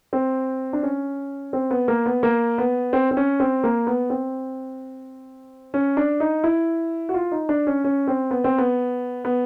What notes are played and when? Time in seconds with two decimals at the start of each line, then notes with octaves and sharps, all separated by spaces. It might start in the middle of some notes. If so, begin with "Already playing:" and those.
0.13 C4
0.73 D4
0.83 C#4
1.53 C4
1.71 B3
1.88 A#3
2.06 B3
2.23 A#3
2.58 B3
2.93 C4
3.11 C4
3.17 C#4
3.40 C4
3.64 A#3
3.87 B3
4.10 C4
5.74 C#4
5.97 D4
6.20 D#4
6.44 E4
7.09 F#4
7.14 F4
7.32 D#4
7.49 D4
7.67 C#4
7.84 C#4
8.07 C4
8.31 B3
8.44 C4
8.58 B3
9.25 B3